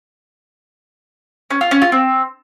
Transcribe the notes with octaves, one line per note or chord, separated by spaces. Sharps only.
C#4
F4
C#4
F4
C4